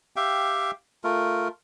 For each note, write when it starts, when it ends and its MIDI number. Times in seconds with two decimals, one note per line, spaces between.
0.16 0.71 67
0.16 0.71 76
0.16 0.71 77
0.16 0.71 79
1.04 1.48 57
1.04 1.48 65
1.04 1.48 70